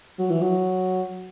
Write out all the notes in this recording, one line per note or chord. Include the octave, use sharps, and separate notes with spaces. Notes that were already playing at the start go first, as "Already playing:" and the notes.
F#3
E3
F#3